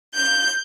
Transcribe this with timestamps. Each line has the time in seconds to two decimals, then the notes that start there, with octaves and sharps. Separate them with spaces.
0.13 G6